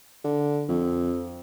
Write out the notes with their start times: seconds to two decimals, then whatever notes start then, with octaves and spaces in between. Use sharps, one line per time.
0.24 D3
0.69 F2